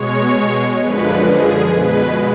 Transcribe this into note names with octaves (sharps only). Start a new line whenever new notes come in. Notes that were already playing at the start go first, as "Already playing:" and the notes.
Already playing: B2 G#3 C#5
F#2 D3 F3 G#3 B4
G#4
B2 G#3 B4